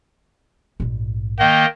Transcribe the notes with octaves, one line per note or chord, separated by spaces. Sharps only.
A#1 G#2
D#3 A#3 D#5 G5